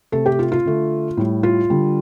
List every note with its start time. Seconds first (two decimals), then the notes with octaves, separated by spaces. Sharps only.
0.12 C3 A3 A4
0.26 G4
0.39 F4
0.52 F4
0.66 D3 A3
1.17 A2 G3
1.43 F4
1.70 D3 G3